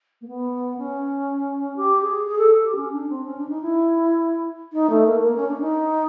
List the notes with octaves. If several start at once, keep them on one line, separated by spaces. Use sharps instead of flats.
A#3
B3
C#4
G4
G#4
G#4
A4
G4
C#4
D4
C4
C#4
D4
D#4
E4
D#4
A3
A#3
A#3
C#4
D4
D#4